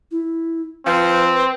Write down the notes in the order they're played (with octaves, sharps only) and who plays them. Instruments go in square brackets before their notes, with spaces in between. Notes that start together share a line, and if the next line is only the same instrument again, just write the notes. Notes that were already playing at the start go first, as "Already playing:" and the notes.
[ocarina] E4
[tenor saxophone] F3 [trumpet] C4 [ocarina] B4